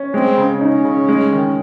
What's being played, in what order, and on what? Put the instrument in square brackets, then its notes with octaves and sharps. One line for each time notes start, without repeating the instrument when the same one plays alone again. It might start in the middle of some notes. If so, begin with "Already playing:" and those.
Already playing: [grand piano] C#4
[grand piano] G#3 [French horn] C4
[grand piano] C#3
[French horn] C#4 [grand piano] D#4
[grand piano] C#3
G#3
D#3